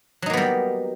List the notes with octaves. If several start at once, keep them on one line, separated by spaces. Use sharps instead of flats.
F#3 G3 A#3 B3 D#4